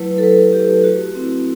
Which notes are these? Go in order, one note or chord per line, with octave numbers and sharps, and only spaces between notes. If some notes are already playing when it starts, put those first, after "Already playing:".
Already playing: F#3 A3 E4 B4
A4
F#3 B4
A3 E4 G4
A3 F#4
C4 E4